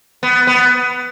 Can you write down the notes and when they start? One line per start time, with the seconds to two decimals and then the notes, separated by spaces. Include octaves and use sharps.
0.23 B3
0.47 B3